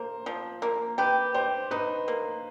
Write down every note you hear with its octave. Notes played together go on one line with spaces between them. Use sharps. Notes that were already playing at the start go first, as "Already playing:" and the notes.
Already playing: A#3 C5
F3
A#3
G4 B4
G4 C5
D#4 B4
A#3